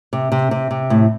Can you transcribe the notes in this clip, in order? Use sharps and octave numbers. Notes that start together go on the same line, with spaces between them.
C3
C3
C3
C3
A2